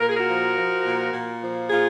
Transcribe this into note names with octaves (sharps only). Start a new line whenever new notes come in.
A#2 A#4
G#4
F#4 A#4
F3
F3
A#2
A#2
F3
A#2 F4 G#4